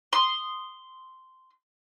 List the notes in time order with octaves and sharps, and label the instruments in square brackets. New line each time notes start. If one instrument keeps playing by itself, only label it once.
[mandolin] C6 D#6